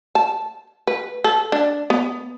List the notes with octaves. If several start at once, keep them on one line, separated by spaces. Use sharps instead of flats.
A5
B4
A4
D4
B3